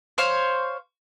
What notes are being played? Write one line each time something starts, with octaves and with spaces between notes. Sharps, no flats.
C5 C#5 F5